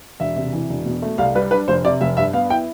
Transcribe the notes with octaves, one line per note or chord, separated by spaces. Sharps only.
E1 E5
C3
E3
E1
B2
A3
C2 F5
G3 B4
D4 B4
F1 C5
C3 D5
F1 E5
G2 E5
B3 F5
E4 G5